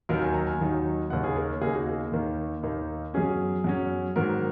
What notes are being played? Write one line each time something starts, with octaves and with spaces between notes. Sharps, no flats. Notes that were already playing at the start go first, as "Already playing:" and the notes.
D#2 D#3 F#3 D#4 A#4
G#5
A#5
G#5
D#2 D#3 F#3 D#4
D#2 C#3 A#3 D#4 F#5
G#4
A#4
C#5
D#2 C#3 A#3 D#4 G#4
F#4
G#4
D#2 D#3 A#3 D#4
D#2 D#3 A#3 D#4
F#2 F#3 C#4 G#4
F#2 F#3 C#4
G#2 D#3 F#3 A#4